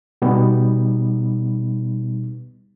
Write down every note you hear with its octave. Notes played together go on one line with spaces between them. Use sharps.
B2 G3 B3 D#4